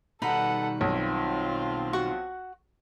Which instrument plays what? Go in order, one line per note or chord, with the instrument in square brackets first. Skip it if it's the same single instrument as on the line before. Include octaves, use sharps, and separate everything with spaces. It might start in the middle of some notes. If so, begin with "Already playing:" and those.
[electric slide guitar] B2 D#3 G3 [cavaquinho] D#4 B4 B5 [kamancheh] A4 F#5
[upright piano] B1 [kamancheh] C4 F4
[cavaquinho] F#4 F#5 C#6